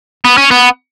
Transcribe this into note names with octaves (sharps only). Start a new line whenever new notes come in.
B3
C#4
B3